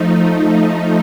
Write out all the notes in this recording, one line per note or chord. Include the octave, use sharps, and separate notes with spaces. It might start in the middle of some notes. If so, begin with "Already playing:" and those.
Already playing: F3 A3 D#4